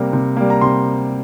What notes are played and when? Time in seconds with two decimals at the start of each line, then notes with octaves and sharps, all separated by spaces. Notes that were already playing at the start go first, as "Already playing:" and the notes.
Already playing: C3 G3 A#3 A#5
0.13 C3
0.37 G3 A#3
0.50 A#5
0.61 C3 C6